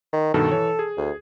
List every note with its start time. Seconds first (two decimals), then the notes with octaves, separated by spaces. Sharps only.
0.13 D#3
0.34 G2 B2 D#3 A4
0.51 E3 C#5
0.79 G#4
0.97 D2